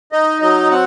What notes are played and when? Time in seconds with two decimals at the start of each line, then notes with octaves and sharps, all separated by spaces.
0.12 D#4 D#5
0.42 F#3 D#5
0.71 C4 F#5